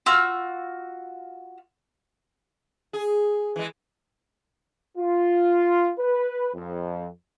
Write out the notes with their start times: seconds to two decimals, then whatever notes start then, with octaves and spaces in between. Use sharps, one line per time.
0.06 F4 F#4 E6
2.93 G#4
3.56 E3 G#3
4.97 F4
5.99 B4
6.54 F2